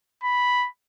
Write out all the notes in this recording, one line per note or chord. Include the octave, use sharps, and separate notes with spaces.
B5